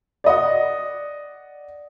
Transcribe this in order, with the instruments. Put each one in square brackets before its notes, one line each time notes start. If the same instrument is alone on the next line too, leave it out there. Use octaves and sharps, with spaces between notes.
[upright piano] D5 D#5 F#5